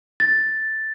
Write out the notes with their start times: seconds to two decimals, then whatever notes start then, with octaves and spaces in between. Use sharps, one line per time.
0.20 A6